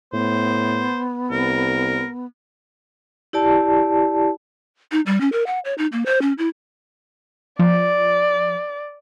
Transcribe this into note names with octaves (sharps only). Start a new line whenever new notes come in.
A2 B3 C5
C2 A#4
E4 G4 D5 A5
D#4
G3
C#4
A#4
F#5
C#5
D#4
A#3
C5
C#4
E4
F3 D5